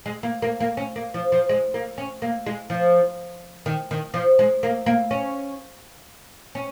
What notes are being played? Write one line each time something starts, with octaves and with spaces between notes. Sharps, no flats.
G#3
A#3
A#3
A#3
C#4
A#3
F3
F3
G#3
A#3
C#4
A#3
G#3
F3
D#3
D#3
F3
G#3
A#3
A#3
C#4
C#4